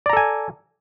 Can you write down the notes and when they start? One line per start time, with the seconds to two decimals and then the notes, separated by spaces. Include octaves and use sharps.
0.06 D5
0.09 A#5
0.13 A4
0.17 G#5